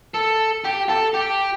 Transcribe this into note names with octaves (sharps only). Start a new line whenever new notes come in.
A4
G4
A4
G4